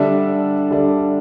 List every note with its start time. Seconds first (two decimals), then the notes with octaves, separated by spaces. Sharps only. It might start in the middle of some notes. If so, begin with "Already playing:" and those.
Already playing: D3 G3 D4 A4 E5
0.70 D3 G3 D4 A4 E5